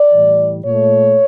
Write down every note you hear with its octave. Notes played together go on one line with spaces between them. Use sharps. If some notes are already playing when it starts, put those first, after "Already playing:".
Already playing: D5
A2 E3 G3
A#2 A3 C#5